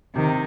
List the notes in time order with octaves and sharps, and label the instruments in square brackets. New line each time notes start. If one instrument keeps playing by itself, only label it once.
[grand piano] C3 [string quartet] D#3